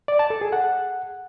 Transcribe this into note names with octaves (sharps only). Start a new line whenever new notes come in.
D5
A5
A4
G#4
F#5